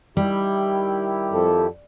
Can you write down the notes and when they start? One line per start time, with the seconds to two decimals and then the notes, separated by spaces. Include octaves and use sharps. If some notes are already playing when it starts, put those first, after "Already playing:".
0.17 D#3 G3 E4 G4
1.32 F2 A4